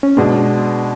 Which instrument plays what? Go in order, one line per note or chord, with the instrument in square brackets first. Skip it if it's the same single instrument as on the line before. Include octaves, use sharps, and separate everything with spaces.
[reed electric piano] C#4
[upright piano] B2 G#3 D4 [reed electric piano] B3